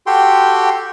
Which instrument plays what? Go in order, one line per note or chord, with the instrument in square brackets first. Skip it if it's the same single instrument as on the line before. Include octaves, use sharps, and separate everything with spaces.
[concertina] F#4 G4 A4 G5 C6